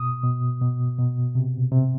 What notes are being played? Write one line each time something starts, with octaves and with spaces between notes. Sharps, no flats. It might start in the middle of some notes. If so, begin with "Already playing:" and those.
Already playing: B2 D#6
B2
B2
B2
C3
C3